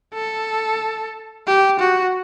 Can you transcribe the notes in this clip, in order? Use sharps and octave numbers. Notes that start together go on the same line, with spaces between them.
A4
G4
F#4